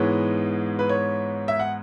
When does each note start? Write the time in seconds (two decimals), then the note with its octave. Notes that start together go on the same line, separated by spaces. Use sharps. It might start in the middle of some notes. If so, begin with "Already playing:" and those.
Already playing: G#2 E3 G#3 B3 C#5
0.79 B4
0.89 C#5
1.48 E5
1.59 F#5